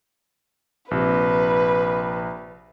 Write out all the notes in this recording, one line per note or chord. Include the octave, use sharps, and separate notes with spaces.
A#1 C3 B4